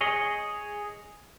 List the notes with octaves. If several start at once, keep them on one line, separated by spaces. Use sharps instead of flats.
G#4 C#5 D#5